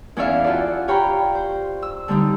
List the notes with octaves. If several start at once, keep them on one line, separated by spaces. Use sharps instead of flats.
E2 C#4 C#5 D5 E5 F5
F4 F#4 A4 D5
G4 C#5 F5 G5 A#5 B5
C5
E6
D3 G3 C4 D#4